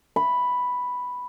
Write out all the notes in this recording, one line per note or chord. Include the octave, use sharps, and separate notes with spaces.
B5